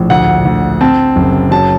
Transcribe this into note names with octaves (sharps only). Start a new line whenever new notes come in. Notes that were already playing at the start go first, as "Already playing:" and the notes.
Already playing: A#1 A2
D2 F#5
D2
C4 A5
F#1
F#3 A5